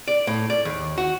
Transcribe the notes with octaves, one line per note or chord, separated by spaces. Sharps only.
D5
A2
D5
D#2
F#4